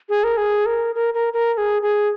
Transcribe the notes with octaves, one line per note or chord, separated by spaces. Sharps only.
G#4
A#4
G#4
A#4
A#4
A#4
A#4
A#4
G#4
G#4